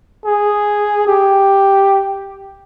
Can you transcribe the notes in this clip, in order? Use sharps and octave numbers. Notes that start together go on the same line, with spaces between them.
G#4
G4